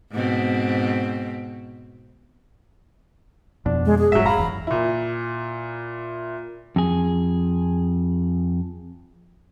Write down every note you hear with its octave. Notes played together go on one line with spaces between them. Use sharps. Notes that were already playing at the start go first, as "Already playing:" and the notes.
G#2 B2 C4
F2 B2 D4
G#3
G#4
F1 G#2 F#3 E5
F5 A#5 B5
F#1 E2
A#2 E4
F2 G#4